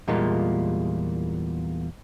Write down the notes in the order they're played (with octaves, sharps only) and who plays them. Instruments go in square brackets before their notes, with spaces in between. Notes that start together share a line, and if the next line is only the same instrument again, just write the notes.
[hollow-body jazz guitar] E2 A#2 G3 G#3 A#3 F4